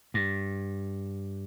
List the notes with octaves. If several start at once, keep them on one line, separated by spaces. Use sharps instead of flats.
G2